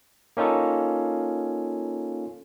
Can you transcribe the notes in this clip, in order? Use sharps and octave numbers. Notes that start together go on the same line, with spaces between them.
A#3 C#4 D#4 F4 A4